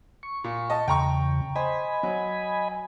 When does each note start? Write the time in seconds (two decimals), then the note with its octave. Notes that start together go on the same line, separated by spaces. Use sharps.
0.23 C#6
0.44 A#2
0.70 D#5 A5
0.88 E2 C#3 G5 A#5 C#6
1.56 C5 D#5 G#5 B5
2.03 F#3